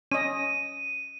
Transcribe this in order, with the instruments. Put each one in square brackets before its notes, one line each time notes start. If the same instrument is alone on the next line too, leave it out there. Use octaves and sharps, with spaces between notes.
[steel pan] C#4 D#5 [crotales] D#7